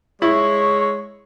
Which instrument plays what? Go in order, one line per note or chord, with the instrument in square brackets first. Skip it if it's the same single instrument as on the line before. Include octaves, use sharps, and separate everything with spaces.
[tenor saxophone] G#3 [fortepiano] E4 [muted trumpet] C#5 [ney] C#6